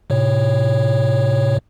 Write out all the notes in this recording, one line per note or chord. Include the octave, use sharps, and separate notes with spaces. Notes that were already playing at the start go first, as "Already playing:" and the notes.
A2 C3 C#5